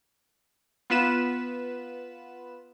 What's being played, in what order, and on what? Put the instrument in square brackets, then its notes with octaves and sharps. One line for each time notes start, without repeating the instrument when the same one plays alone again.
[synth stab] B3 F4 B4 E7